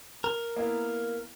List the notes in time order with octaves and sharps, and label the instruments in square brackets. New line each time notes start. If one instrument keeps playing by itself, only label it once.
[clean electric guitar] A#4
[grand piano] A#3 B3 E4